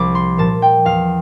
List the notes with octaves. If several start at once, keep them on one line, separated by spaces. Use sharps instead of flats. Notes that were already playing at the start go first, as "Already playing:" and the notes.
Already playing: C2 F3 D6
C6
A#2 F3 A5
G5
E2 F5